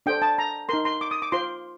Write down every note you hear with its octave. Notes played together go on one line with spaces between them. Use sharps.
D4 A4 C5 G5
A5
A#5
D#4 A#4 C6
C6
D6
D#6
D6
F4 C5 C6